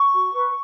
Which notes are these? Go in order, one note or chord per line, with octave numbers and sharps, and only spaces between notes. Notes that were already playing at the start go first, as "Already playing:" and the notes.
Already playing: C#6
F#4
B4